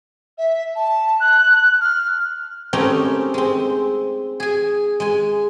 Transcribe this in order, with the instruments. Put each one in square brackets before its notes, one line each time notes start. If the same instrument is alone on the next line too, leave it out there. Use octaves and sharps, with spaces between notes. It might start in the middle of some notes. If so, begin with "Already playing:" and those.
[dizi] E5
A5
F#6
F6
[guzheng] A3 C4 C#4 D#4 G4 A#4
G#3 C4
G#4 G#5
G#3 G#5